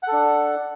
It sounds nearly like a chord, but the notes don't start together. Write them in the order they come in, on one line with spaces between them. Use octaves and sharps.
F#5 A4 D4